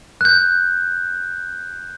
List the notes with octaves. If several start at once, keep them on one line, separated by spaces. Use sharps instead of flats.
F#6 G6